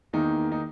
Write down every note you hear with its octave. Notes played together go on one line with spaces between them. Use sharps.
E2 D#3 A#3 D#4
D#4